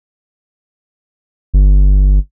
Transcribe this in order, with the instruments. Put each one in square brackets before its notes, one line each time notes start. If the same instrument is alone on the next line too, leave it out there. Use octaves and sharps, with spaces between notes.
[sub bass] G1